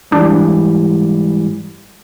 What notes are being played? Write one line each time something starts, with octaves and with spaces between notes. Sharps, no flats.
G#2 E3 G3 D4